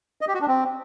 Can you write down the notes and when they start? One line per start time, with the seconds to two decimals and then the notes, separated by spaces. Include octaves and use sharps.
0.21 D#5
0.28 G4
0.34 F#4
0.41 D4
0.48 C4